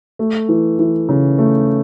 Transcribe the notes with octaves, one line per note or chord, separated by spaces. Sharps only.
A3
E3
E3
C#3
A3